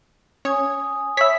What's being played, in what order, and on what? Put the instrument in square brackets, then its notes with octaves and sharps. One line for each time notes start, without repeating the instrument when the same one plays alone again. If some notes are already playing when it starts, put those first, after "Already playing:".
[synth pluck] C#4 C#5 [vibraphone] G#5 D#6
[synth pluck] C#5 B5 [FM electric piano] E5 B6